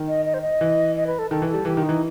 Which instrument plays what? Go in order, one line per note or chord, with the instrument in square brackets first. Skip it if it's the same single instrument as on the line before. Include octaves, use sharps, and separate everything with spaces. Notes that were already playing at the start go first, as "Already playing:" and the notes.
Already playing: [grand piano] D#3
[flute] D#5
D#5
C5
D#5
[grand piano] E3
[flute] D#5
B4
A4
[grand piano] D#3 [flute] A4
[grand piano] E3
[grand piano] G3 [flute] A4
[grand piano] E3 [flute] G4
[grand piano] D#3
[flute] D#4
[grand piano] E3